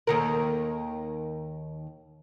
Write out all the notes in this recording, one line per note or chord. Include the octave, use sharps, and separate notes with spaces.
D#2 D#3 A#4